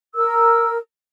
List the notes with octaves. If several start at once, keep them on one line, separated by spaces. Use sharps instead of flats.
A#4 E6